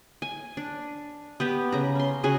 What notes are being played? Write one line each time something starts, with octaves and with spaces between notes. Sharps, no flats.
G#5
D4
B3 G4 B4
C#3 A#5
C#4 C6
C#3 F#4 G#4 G#5